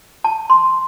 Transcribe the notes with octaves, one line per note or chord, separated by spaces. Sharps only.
A5
C6